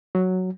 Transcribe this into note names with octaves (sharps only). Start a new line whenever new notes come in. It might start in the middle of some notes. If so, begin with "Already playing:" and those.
F#3